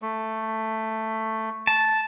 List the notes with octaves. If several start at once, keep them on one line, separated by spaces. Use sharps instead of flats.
A3
A5